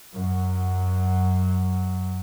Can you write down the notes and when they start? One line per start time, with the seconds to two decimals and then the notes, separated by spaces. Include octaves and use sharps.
0.14 F#2 F#3